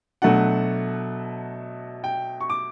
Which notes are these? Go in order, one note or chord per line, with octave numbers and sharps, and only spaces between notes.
B2 F#3 A3 D4 F#5
G5
C#6
D6